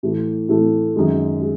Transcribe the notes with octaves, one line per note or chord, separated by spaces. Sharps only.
A2 E3 A3
A2 E3 A3
F#2 D#3 G#3
G#3